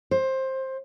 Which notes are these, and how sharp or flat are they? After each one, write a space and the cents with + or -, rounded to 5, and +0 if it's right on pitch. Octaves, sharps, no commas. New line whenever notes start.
C5 +15